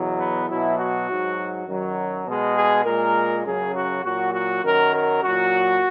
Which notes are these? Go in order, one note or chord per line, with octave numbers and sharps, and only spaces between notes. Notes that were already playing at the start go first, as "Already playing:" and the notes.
Already playing: E2 B2 F#3
B3
B2 F#3 E4
F#4
G#2 F#3
F#2 D#3 F#3
B2 G#3
G#4
A#2 G#3 A#4
F#2 C#3 F#3 G#4
F#4
A#2 F#3 F#4
F#4
F#2 D#3 F#3 A#4
A#4
A#2 F#3 F#4